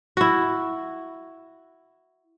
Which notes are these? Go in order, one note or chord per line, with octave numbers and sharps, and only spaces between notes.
E4 F#4